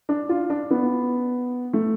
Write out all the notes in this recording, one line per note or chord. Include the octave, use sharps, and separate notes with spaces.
D4
F4
D4
B3
A3